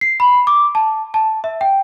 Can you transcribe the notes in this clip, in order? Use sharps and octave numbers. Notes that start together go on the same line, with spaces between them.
C7
B5
D6
A5
A5
E5
G5